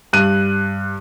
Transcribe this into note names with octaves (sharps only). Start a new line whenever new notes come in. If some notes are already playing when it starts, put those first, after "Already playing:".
G2 F#6 D#7